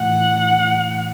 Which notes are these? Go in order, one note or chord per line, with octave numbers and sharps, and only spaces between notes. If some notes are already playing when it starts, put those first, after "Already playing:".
Already playing: A2 E3 A3 E4 F#5